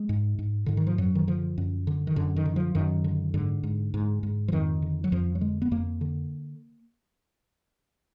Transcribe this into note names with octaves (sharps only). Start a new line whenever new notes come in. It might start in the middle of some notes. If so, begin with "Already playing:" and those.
Already playing: G#3
G#2
G#2
G#2 D3
D#3
F3
F#2 F#3
D#3
D3 F3
F#2
D3
D#3
F#2 D3
D#3
D3
F3
F#2 D#3
D3
G#2 D3
G#2
G#2
G#2
F3
F2 D#3
D3
F#3
F2 F3
F#3
D3 G#3
B3
F2 A#3
D3